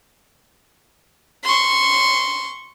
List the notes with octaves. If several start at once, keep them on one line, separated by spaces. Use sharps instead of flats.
C6 C#6